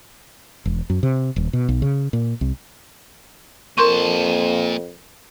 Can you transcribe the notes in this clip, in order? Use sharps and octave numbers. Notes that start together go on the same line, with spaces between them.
E1
F#2
C3
D#1
B2
B1
C#3
A#2
C2
F2 A#2 A#4 A5 C6 C#6